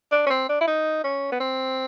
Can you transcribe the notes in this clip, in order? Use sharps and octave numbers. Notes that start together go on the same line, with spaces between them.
D4
C#4
C4
D4
E4
D#4
C#4
B3
C4